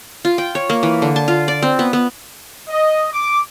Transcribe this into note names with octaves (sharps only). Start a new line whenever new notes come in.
F4
G5
C#5
A#3
E3
D3
A5
F4
D5
C4
B3
B3
D#5
D6